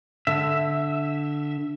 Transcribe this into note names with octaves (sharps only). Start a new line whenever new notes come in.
D3 E5